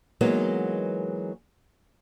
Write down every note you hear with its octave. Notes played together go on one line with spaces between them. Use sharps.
E3 F#3 G#3 A#3 B3 D#4